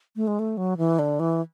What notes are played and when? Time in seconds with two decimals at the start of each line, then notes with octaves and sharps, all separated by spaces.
0.16 A3
0.27 G#3
0.39 A3
0.57 F#3
0.78 E3
0.99 D3
1.20 E3